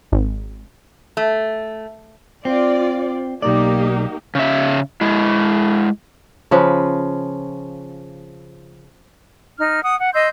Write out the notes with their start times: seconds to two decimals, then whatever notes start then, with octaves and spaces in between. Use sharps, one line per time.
0.12 G#1
1.17 A3
2.45 C4 F4 D5
3.42 B1 A#3 D#4 G4 D5
4.35 C#3 E5
5.01 G#3 E4
6.51 C#3 F3 B4
9.58 D#4 F6
9.84 F#5 D#6
9.99 F#5
10.14 D#5 C6 E6 G6